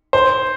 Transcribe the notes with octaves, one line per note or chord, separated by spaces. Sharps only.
C5